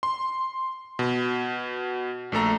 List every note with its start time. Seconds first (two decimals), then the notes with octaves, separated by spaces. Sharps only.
0.03 C6
0.99 B2
2.32 A#1 A3 A4 A#5